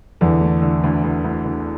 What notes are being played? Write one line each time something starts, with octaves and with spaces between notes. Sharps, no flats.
E2 D3
A3
D3
D2
D2
D2
D2